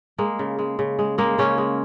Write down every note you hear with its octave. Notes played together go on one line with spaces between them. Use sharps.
G#3 A#3
C#3
G#3
C#3
G#3
G#3 A#3
C#3 C#4
G#3